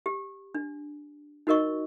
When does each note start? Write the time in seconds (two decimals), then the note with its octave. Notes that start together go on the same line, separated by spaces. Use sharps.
0.06 G4
0.55 D4
1.47 D#4 F#4 A#4 D#5 C#6